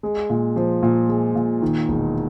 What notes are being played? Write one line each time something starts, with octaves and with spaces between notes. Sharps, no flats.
G#3
A#2
F3
A#2
G#3
A#2
D#3
E1